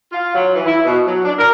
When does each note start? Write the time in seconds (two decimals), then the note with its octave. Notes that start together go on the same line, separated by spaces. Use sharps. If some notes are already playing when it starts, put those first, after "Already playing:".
0.12 F4
0.35 F#3
0.54 E3
0.66 E4
0.85 B2
1.07 F#3
1.25 D4
1.38 A#4